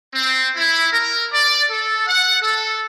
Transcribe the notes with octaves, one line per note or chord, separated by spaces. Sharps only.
C4
E4
A#4
D5
A4
F#5
A4